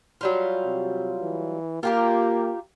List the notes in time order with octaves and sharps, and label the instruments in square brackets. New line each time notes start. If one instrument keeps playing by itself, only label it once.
[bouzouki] F#3 G3 F4
[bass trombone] C3
E3
[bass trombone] A#3 [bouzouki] F4 G4 A#4